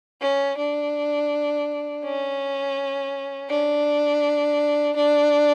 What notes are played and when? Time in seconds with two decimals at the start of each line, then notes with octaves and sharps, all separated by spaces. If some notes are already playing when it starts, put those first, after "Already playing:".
0.21 C#4
0.58 D4
2.04 C#4
3.50 D4
4.96 D4